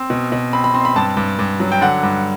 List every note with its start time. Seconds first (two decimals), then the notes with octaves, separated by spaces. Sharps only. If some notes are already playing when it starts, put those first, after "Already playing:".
Already playing: C4
0.10 B2
0.32 B2
0.53 C4 B5
0.64 B5
0.74 C4 C6
0.85 B5
0.96 G2 A5
1.17 G2
1.39 G2
1.60 F#3
1.72 G5
1.81 D3 F#5
2.03 G2